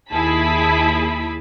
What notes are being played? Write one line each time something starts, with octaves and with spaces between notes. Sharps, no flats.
D#2 E4 G#4 A5 B5 B6